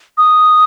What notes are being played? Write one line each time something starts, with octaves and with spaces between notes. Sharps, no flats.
D#6